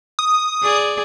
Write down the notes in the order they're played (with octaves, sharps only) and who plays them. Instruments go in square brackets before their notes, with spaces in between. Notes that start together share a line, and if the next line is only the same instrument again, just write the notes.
[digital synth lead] D#6
[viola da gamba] G#4 D5